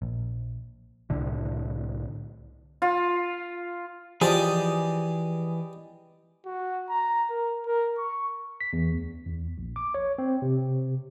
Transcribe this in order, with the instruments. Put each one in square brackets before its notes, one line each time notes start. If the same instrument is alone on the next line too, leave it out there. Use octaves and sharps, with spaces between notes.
[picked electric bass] A#1
C2 A2 D3
[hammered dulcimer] F4
[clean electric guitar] E3 G#4 [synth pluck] F3 [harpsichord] G4 D5 D#5
[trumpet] F#4
A#5
A#4
A#4
C#6
[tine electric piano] B6
E2
D2
E2
A#1
D6
C#5
C4
C3